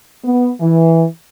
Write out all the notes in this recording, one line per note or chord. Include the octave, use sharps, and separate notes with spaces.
B3
E3